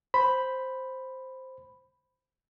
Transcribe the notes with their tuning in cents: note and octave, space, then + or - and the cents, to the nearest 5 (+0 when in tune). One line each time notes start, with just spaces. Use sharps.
C5 +0 B5 +5